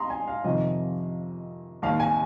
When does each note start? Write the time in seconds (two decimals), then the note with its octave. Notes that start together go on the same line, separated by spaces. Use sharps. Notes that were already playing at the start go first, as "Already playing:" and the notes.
Already playing: A#5 C6 D#6
0.10 G#5
0.28 F5
0.44 F2 C3 D#3 D#5
1.82 D#2 D#3 F5
2.00 G#5